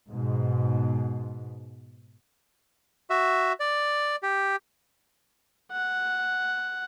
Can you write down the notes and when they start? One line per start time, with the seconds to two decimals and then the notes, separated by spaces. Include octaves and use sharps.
0.10 G#2 B2
3.10 F#4 E5
3.60 D5
4.23 G4
5.72 F#5